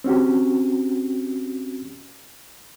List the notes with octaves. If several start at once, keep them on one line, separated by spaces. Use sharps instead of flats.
C4 C#4 F#4 G4